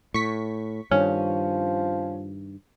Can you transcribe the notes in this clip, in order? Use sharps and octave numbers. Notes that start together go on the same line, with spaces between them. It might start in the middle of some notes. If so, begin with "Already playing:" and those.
A2 C#6 B6
G2 D#3 F3 C#4